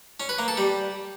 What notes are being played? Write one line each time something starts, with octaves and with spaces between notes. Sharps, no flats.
C#4
B4
A#3
A4
G3